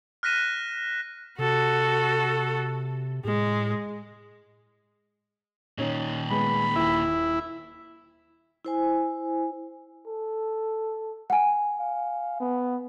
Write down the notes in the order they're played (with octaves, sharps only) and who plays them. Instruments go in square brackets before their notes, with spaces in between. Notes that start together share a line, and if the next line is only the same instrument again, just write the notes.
[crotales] F6 F#6 A#6 B6 D#7 E7
[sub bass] C3 [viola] F#4 A4
[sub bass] A2 [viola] G#3
[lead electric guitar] A#2 D#3 [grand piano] C#4 D#4 C#5
[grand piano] G#3 B3 [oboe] B5
[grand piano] D#1 [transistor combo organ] E4
[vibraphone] E4 C5 G#5
[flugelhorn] A4
[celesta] F#5 G#5
[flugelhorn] F5
B3